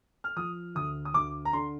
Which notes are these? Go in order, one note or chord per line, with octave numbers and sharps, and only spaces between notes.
F6
F3 D#6
D2 D#6
D#6
D2 D6
A#5
D3 C6